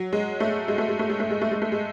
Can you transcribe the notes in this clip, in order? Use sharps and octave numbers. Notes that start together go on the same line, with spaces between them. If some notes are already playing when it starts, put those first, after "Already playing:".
Already playing: F#3
G#3
A3
G#3
A3
G#3
A3
G#3
A3
G#3
A3
G#3
A3
G#3